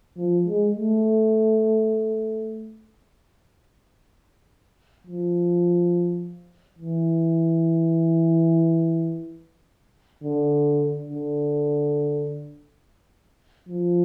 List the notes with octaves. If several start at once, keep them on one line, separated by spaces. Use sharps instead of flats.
F3
G#3
A3
F3
E3
D3
D3
F3